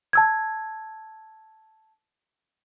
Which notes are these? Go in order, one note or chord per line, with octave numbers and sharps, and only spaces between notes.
A5 E6 G#6